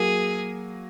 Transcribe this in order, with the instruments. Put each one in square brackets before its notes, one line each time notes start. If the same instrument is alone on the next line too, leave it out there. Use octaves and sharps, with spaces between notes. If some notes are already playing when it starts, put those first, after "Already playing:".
Already playing: [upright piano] F#3 A#3 [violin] G#4